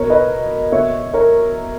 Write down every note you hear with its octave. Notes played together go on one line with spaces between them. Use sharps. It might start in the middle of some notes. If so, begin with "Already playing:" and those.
Already playing: B2 A#4 C#5
B4 D#5
B2 C#5 E5
A#4 C#5